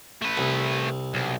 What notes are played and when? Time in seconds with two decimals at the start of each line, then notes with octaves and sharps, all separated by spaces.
0.22 A3 B4
0.37 C2
1.14 B1